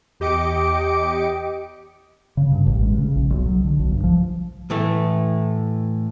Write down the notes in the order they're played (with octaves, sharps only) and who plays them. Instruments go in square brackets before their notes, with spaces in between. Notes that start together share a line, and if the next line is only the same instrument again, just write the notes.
[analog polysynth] E2 G4 D#5 D6 C#7 D7
[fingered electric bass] C#3
G2
A1
G#3
C#3
A#1
B1
F#3
D3
B1
G2
F3
[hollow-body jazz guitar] A2 E3 A3